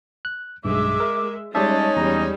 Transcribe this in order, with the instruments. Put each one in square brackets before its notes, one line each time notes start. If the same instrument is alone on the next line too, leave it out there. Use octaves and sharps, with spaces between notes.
[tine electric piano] F#6
[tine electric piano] B1 G2 [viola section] G#3 E5 [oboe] D6
[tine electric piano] A#4
[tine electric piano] G3 D5 E5 [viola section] G#3 [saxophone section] C#4 D#4 [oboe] A5
[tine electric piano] E2 [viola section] G3 G#3 [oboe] A#5